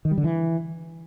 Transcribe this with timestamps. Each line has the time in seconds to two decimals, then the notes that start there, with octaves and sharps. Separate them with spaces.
0.05 D#3
0.11 G3
0.18 D3
0.24 E3